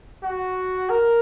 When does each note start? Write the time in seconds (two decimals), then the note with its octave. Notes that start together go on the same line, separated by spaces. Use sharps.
0.23 F#4
0.90 A#4